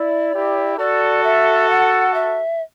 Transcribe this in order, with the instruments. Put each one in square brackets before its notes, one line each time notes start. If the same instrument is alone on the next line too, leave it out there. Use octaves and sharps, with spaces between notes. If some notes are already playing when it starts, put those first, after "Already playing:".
Already playing: [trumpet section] E4 [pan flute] D5
[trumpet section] E4 G4
[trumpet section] F#4 A4 [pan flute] D5
[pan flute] E5
F#5
E5